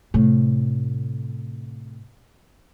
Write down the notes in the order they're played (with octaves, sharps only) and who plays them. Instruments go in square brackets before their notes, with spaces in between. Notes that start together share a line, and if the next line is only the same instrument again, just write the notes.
[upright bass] A2 C3